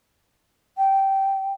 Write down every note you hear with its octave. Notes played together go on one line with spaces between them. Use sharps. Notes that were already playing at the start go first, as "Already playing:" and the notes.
G5